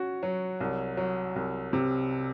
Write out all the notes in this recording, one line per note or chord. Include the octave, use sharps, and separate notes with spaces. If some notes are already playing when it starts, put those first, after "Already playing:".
Already playing: C#4 F#4
F#3
C2
F#3
C2
C3